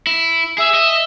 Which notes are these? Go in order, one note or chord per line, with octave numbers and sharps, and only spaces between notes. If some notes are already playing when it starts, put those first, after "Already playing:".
E4
G#4 E5
D#5